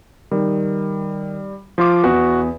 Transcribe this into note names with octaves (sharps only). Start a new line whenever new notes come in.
D#3 G3
F3 F4 D6
E2 F#4